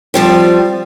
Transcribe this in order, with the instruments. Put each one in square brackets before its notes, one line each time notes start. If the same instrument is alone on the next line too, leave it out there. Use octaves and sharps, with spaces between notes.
[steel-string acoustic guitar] F3 G3 C4